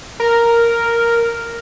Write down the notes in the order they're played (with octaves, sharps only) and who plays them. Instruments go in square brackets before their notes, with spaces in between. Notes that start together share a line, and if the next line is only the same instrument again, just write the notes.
[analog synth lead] A#4